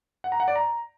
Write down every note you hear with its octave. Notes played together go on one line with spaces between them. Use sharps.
F#5
A#5
F#5
D5
A#5